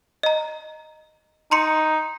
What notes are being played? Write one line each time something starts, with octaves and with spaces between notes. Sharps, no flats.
D#5 A#5
D#4 A#5 C6 C#7